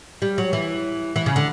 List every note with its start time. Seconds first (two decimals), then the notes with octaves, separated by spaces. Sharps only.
0.22 G3
0.38 F#3
0.53 E3
1.16 E3
1.26 C#3
1.36 D3